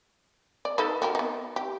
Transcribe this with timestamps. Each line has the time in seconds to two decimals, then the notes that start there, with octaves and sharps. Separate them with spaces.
0.65 D5
0.78 D#4 A4 B4
1.02 F#4 G4 A#4
1.15 B3 D#4
1.56 G4